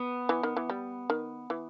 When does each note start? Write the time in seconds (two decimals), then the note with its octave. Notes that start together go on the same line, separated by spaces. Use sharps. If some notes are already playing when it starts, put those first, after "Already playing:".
Already playing: B3
0.29 E3
0.43 D#3
0.57 E3
0.69 G3
1.10 D#3
1.50 E3